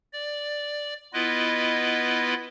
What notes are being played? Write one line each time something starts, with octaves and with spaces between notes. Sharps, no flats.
D5
B3 E4 F4 B4 D#5